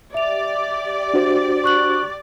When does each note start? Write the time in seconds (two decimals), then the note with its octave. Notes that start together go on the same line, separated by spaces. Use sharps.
0.14 G4 D5 E5 F7
1.14 D4 F#4 C5
1.64 C#6 F#6 F#7